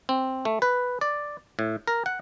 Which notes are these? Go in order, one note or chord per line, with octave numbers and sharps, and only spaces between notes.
C4
A3
B4
D5
A2
A#4
F#5